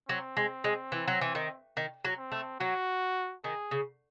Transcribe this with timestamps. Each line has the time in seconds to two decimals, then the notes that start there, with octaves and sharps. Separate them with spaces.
0.08 F#3 C4
0.37 G#3
0.64 G#3
0.92 E3
1.08 F#3
1.21 E3
1.35 D#3
1.77 D#3
2.04 F#3
2.18 C4
2.32 A3
2.60 F#3 F#4
3.44 D#3 G#4
3.71 C#3